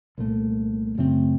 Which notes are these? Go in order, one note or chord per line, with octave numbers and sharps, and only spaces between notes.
C2 A#2 A3
F#2 C#3 A3 C4